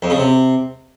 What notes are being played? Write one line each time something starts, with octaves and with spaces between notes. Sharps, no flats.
F2
C#3
C3